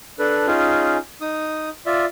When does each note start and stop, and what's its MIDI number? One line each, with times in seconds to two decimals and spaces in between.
0.19 0.46 62
0.19 0.46 69
0.19 0.46 71
0.47 0.97 61
0.47 0.97 63
0.47 0.97 65
0.47 0.97 68
1.21 1.69 63
1.21 1.69 87
1.86 2.05 65
1.86 2.05 74
1.86 2.05 76